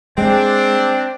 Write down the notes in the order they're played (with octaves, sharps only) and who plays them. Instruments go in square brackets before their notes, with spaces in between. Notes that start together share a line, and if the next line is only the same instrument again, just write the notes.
[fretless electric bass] G#3 [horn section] C4 D4